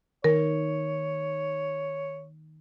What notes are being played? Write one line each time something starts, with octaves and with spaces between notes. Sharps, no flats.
D#3 A#4 C#5